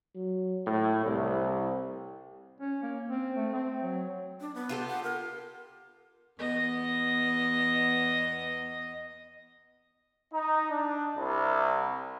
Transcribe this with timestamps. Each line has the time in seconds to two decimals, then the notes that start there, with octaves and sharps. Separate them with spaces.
0.15 F#3
0.66 A2
1.06 C2
2.61 C#4
2.82 A#3
3.08 C4
3.36 A3
3.53 C4
3.82 F#3
4.41 D4
4.55 B3
4.69 F4 G4 A4
4.88 F#5
5.03 A#4
6.39 E2 B3 D#5
10.33 D#4
10.71 D4
11.18 C2